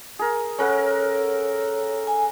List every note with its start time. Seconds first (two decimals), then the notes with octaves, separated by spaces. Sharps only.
0.19 G#4 A#4
0.58 C#4 A4 A#4 C#5 F#5
2.07 G#5